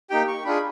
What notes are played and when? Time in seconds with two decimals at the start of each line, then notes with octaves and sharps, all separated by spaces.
0.10 A#3 D#4 G4 G5
0.28 C#6
0.45 D4 F4 G#4 B5